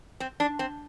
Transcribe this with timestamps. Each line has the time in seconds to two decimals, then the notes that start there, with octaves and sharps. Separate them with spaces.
0.20 C4
0.40 D4
0.59 C4